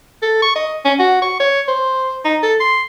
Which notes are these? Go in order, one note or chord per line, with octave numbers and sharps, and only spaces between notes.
A4
C#6
D#5
C#4
F#4
C#6
C#5
C5
D#4
A4
C6